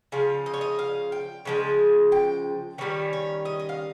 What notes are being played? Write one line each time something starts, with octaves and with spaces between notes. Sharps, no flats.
C#3 F3 F5
D#5
C#5
D#5
F5
G5
C#3 F3 G#3
G5
D#3 G3 C#4 C#5
C#5
D#5
D#5
F5